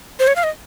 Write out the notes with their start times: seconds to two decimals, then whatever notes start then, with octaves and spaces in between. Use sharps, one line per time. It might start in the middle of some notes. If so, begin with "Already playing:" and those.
0.19 C5
0.27 C#5
0.36 F5
0.44 D#5